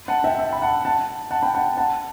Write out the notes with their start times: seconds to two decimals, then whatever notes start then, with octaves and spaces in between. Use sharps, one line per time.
0.08 F#5 A5
0.24 E5 G5
0.39 E5 G5
0.53 B5
0.62 F#5 A5
0.85 F#5 A5
1.31 F#5 A5
1.42 G5 B5
1.54 F#5 A5
1.77 F#5 A5